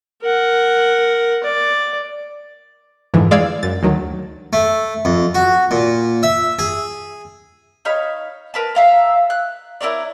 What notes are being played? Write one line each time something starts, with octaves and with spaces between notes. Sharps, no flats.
A#4 F#5
D5
F2 G#2 D3 E3
G#3 D5 F5 E6 G#6
F#2 A6
D2 D#3 F#3
A3
F2
F#4
A#2
E5
G#4
D#4 C#5 F5 B5
A#4 B4 A5
E5 F5 A#5
F#6
E4 A#4 C#5 D5